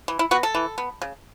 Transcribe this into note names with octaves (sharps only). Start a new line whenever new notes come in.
E3
E4
B3 F#4
A4
E3
B3
C#3